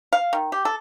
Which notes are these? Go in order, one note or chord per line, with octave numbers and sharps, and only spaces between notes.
F5
D#3
G4
A4